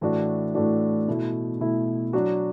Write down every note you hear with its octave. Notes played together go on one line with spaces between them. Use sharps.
A2 E3 A3 D4 F#4
A2 E3 A3 D4 F#4
B2 A3 E4
B2 A3 E4
F#3 D4 F#4